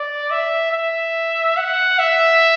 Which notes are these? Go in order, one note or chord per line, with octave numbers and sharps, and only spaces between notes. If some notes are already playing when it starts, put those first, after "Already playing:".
Already playing: D5
E5
E5
F#5
E5